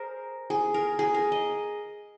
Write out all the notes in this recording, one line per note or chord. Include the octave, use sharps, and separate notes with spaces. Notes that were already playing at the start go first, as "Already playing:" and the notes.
Already playing: G#4 A#4 C5
G#4
A#4
G#4
A#4
D#5